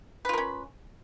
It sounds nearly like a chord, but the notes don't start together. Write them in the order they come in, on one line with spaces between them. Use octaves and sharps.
B4 F4 A#4 C#4